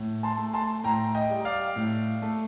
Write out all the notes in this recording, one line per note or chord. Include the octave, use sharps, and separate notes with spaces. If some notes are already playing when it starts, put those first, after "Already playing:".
Already playing: A2
A5 C6
A3
A5 C6
A2 G5 A#5
D#5 G5
G3
D5 F5
A2
A3